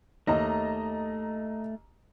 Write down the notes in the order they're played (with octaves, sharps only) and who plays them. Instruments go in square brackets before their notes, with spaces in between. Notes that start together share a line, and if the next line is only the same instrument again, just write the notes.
[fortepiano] D#2 [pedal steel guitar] A3 [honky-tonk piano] D#5 A#5